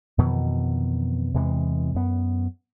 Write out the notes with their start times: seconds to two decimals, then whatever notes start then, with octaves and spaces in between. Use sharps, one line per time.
0.18 F2 B2 D#3 E3
1.34 E2 C3 E3 G#3
1.94 F#2 B3